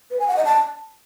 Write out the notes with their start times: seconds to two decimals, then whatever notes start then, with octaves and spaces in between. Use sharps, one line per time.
0.11 B4
0.19 G#5
0.28 F#5
0.37 D#5
0.45 A5